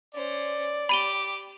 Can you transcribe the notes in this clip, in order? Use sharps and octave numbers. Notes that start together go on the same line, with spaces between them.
C#4 C5 D5
G4 B5 D6 D#7 G7